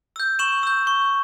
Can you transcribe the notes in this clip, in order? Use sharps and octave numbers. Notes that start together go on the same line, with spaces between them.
E6 G6
C#6 E7 F#7
E6 G6
C#6